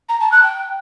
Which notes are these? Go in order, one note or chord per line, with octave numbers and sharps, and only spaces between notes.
A#5
A5
F#6
G5